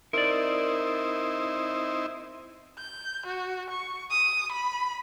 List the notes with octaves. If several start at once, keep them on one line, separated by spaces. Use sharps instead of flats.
C4 D#4 E4 A#4 D5
G6
F#4
C#6
D#6
B5